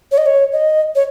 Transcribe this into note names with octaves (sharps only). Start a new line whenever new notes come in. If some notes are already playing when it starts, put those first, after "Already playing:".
C#5
D#5
C#5
D#5
C#5